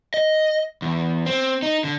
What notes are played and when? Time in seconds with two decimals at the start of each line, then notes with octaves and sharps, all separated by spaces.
0.14 D#5
0.82 E2
1.26 C4
1.63 D#4
1.84 D3